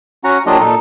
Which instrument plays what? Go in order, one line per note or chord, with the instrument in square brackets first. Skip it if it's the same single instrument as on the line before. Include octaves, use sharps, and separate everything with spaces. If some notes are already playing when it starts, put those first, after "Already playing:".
[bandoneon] C#4 F#4 F#5 A#5
F#3 A#3 D4 F4 G4 D#5
A#2 D#4 A4